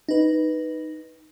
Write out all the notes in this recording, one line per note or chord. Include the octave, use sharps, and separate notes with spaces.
D#4 B4